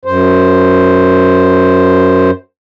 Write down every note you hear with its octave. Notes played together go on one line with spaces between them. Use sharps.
F#2 C5